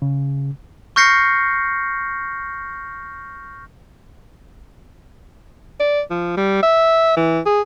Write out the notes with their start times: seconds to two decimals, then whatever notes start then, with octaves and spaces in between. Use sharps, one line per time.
0.02 C#3
0.96 C#6 F6 G6 A#6 C7 C#7
5.80 D5
6.10 F3
6.37 G3
6.63 E5
7.17 E3
7.46 G#4